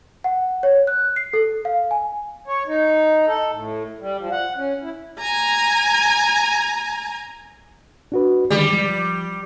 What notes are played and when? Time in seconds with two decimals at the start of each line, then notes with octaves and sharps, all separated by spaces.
0.24 F#5
0.63 C#5
0.87 F#6
1.16 C7
1.33 A4
1.65 F5
1.91 G#5
2.47 C#5
2.68 D#4
3.27 A4
3.52 A2
4.00 G3
4.19 F3
4.32 F#5
4.57 C#4
4.82 E4
5.20 G#5 A#5
8.12 D4 F#4 B4
8.50 D3 D#3 G3 G#3
8.73 F3